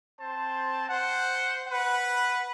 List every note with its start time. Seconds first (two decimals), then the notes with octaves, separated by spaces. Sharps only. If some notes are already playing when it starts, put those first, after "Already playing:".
0.21 C4 C5 A5
0.88 C5 F#5
1.68 B4 F#5